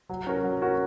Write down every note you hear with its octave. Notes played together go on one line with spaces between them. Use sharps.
F#3
C#4 F#4 A#4
F#3
C#4 F#4 A#4